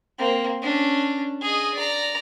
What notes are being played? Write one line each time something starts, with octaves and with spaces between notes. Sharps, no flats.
A#3 C4
C#4 D4
G#4 D#5
D5 A#5